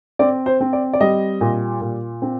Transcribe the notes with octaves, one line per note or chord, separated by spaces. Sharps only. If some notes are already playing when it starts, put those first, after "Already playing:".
C4 D5
C5
C4
D5
D5
G3 D#5
A#2
A#2
C4